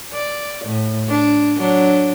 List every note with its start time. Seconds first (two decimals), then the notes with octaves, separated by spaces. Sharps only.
0.13 D5
0.65 A2
1.08 D4
1.56 F#3 D4